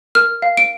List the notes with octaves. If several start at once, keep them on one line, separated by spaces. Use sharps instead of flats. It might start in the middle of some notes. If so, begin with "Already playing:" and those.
A#4 F6
F5
D7